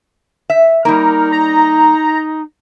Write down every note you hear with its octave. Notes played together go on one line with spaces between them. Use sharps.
E5
G3 A#3 D#4 A#4
A#5